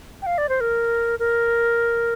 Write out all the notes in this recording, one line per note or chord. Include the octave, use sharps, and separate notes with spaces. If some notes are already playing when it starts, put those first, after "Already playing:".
G5
F5
D5
C5
A#4
A#4